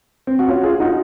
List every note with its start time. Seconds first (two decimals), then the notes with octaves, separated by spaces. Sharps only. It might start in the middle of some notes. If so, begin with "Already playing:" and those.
0.27 C4
0.39 F#4
0.48 C#4 F4
0.64 F4 G#4
0.80 D#4 F#4